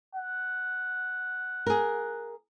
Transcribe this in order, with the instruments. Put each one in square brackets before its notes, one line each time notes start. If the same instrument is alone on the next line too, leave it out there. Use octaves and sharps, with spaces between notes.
[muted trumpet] F#5
[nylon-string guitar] G#4 A#4